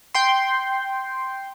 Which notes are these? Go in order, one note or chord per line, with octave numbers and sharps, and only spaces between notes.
G5 C6